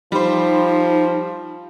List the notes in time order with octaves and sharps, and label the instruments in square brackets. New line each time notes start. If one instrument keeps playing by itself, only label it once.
[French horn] F3 [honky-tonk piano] G3 C5 [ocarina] D#4